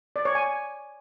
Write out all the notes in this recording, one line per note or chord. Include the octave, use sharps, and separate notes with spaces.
D5
C#5
G#5